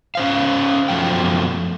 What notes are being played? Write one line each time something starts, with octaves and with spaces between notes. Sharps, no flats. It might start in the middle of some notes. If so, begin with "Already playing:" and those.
C#4 C5 F5
F#2 B2 F3 A3 G5